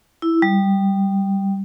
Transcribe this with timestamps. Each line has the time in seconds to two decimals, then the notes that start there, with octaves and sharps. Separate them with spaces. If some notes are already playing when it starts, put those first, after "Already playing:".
0.22 E4
0.42 G3